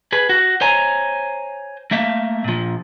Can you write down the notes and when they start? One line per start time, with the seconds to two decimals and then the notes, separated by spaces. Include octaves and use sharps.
0.12 G#4 B4
0.29 F#4
0.61 C5 C#5 G#5 A#5
1.91 A3 A#3 E5 F5
2.44 A#2 F3